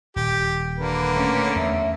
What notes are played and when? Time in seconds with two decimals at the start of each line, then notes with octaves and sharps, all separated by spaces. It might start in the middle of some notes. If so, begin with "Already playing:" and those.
0.16 D#1 G4
0.78 D3 A#3 B4
1.12 A3 C#4
1.56 E2 E5